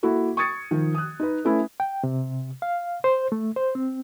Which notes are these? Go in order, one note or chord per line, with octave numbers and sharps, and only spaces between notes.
A#3 E4 F#4 A4
C#6 D#6 G#6 A6 C#7
D#3 F3
D#6 F#6
D#4 B4
A3 C#4 E4 B4
G5
C3
F5
C5
A3
C5
C4